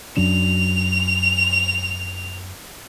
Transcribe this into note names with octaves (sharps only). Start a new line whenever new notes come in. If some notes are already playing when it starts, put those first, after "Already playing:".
F#2 F#3 D4 F7